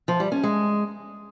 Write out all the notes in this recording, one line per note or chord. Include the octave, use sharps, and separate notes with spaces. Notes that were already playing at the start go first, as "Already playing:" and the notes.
F3
G3
C#4
G#3